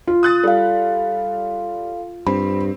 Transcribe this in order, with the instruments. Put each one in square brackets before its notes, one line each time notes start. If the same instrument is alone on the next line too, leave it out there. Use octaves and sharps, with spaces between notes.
[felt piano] F4
[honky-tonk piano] D#6 F#6 A6
[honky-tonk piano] G3 [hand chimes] A4 F5
[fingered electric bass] G2 [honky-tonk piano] C4 [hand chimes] B5